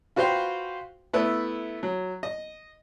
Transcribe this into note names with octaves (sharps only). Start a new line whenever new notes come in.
F4 F#4 B4 C5 F5 G5
A3 B3 E4 B4
F#3
D#5